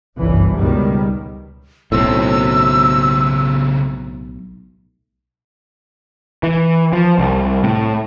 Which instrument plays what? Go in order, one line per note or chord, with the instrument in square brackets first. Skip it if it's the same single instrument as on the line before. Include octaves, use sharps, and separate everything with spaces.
[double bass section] G1 C2 F#2 E3
C#2 B2 D#3 G3
[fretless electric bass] B1 A2 [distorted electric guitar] C#3 C4 [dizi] E6
[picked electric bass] E3
F3
C2
A2